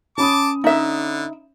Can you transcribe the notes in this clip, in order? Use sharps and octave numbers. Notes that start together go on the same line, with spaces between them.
C#4 A5 B5 D6 D#6
D3 D#4 E5